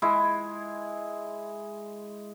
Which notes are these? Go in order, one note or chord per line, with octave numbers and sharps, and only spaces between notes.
G#3 E4